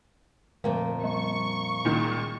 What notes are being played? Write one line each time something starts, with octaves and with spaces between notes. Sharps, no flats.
F2 A#2 D3 A3
G3 C#6
C#2 A#2 D#3